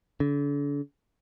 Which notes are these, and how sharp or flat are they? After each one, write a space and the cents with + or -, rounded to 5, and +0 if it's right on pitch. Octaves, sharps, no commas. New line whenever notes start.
D3 -40